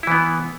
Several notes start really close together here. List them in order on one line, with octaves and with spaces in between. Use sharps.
E4 E3 B3